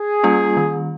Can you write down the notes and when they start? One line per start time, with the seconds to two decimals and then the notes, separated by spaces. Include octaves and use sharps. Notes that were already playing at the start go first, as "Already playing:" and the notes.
Already playing: G#4
0.23 G3 A#3 C#4 F4
0.57 D#3